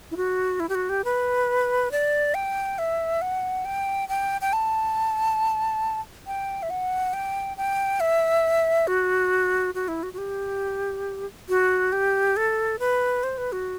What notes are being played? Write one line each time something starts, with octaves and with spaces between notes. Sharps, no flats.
E4
F#4
E4
G4
F#4
G4
B4
D5
G5
E5
F#5
G5
G5
G5
A5
G5
E5
F#5
G5
G5
E5
F#4
F#4
E4
F#4
F#4
G4
F#4
G4
A4
B4
C5
B4
F#4